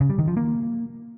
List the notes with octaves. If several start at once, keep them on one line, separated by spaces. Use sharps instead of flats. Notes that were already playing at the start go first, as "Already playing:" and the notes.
C#3
G3
D#3
F3
A#3